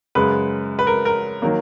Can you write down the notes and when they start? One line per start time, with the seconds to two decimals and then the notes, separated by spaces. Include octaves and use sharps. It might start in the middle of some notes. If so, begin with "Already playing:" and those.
0.15 F#2 C#3 G#3 B4
0.79 B4
0.87 A#4
1.05 A#4
1.42 D#3 F#3 A#3